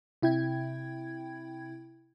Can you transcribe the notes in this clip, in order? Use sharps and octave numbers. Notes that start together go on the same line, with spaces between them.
C3 E4 G5 G#6